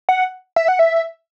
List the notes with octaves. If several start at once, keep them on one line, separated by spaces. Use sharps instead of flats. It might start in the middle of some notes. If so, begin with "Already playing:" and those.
F#5
E5
F#5
E5